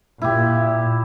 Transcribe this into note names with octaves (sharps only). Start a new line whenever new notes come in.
A#2 E4 G4